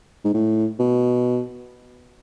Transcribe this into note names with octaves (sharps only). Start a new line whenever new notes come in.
G#2
A2
B2